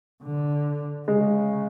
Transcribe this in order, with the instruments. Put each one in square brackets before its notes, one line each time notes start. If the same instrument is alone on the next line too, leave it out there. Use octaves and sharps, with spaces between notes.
[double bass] D3
[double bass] C#3 [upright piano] G#3